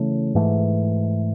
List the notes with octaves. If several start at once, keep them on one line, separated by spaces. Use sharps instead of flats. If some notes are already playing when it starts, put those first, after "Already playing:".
Already playing: C#3 E3 A3
G#2 E3 A3